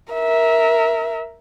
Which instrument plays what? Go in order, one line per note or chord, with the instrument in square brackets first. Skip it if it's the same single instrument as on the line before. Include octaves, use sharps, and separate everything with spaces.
[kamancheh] A#4 E5